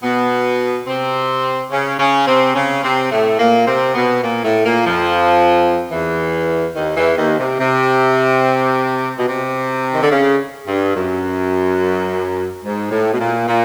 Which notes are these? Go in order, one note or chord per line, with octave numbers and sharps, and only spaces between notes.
B2 B3
C3 C4
C#3 C#4
C#3 C#4
C3 C4
C#3 C#4
C3 C4
A2 A3
A#2 A#3
C3 C4
B2 B3
A#2 A#3
A2 A3
A#2 A#3
F2 F3
E2 E3
D#2 D#3
E2 E3
D#2 D#3
C3
C3
B2
C3
D#3
D3
C#3
G2
F#2
G#2
A2
B2
A#2
A#2